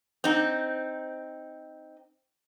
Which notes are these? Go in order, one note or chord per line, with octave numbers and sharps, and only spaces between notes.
C4 D#4